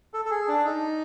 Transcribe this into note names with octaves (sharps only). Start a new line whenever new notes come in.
A4
A4
G#4
D4
D#4